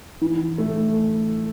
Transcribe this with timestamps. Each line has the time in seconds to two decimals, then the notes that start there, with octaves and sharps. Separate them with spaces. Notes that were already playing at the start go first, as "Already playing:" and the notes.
0.21 E3
0.58 A3